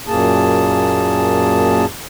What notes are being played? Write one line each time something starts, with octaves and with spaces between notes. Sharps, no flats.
F#2 A#2 A#3 G#4 A5